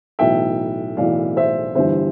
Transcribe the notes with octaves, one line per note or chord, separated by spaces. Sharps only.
B1 A2 E3 E5 G5
B1 A2 E3 D5 F5
C5 E5
G1 G2 E3 C5 E5